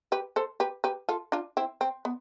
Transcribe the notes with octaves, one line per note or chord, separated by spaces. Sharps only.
G4 B4
A4 C5
G4 B4
G4 B4
F4 A4
D4 F4
C4 E4
C4
B3